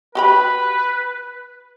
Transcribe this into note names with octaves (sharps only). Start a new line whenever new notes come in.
F#4 G4 B4 B5